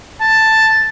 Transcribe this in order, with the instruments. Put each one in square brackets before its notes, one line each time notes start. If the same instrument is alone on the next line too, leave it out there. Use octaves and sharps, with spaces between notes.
[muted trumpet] A5